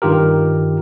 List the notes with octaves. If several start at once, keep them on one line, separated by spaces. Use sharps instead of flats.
G2 D#3 F4 G4 A#4